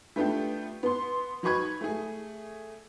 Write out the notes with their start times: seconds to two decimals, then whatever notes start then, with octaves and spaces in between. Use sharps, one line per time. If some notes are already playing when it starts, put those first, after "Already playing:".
0.16 A3 B3 D4 F4 G4
0.83 B3 C6
1.43 F#3 D#4 B4 C#6 G#6
1.81 A3 G#4